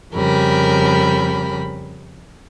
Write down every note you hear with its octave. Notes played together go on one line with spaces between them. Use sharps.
F2 C#3 G3 A#4 B5